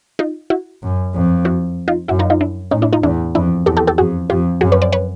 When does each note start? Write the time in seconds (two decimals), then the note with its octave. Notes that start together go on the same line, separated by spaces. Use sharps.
0.19 D#4 F4
0.50 E4 F#4
0.83 F#2
1.14 F2
1.45 E4 F#4
1.88 D#4 F4
2.08 F#2 E4 F#4
2.19 D#4 F4
2.30 D#4 F4
2.41 D4 E4
2.71 A2 C#4 D#4
2.82 D4 E4
2.93 D#4 F4
3.03 E2 D4 E4
3.35 F2 D4 E4
3.66 E2 G4 A4
3.77 G4 A4
3.87 G4 A4
3.98 F2 F#4 G#4
4.30 F2 F4 G4
4.61 F#2 F#4 G#4
4.72 B4 C#5
4.82 C5 D5
4.92 B4 C#5